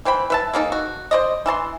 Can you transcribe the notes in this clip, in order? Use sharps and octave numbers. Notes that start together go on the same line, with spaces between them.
E3 C5 G5 B5
B4 E5 A5
G#3 A#3 D#4 A4
F#4
C5 D5 D#5
E3 E5 A5 C6